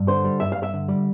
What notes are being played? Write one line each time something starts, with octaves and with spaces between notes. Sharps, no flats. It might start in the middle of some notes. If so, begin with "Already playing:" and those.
Already playing: G2
D3 C5
G3
G2 E5
G2 F5
E5
D3
G3